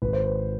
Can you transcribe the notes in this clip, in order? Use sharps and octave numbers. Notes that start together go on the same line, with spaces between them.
G#1 B4
C5
B4